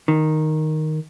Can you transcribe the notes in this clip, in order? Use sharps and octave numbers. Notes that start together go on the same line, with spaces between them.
D#3